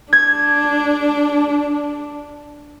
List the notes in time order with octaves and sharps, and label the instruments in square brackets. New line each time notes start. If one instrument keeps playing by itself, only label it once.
[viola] D4 [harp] G#6